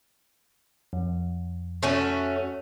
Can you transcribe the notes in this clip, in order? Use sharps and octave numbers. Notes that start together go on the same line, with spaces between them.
F2
A3 C#4 F#4